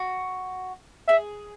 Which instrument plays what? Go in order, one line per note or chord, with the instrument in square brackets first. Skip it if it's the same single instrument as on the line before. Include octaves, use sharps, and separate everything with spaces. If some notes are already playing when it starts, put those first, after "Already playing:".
Already playing: [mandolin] F#4
[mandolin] G#4 [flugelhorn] E5